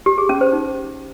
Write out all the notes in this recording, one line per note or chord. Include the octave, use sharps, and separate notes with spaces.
G4
G#4
C#4
C5
D#4